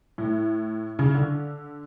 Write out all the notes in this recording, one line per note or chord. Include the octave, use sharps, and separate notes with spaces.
A2
C#3
D3